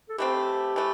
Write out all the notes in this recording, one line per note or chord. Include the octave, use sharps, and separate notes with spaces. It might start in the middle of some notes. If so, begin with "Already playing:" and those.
A4
E3 A3 C4 G4
E3 A3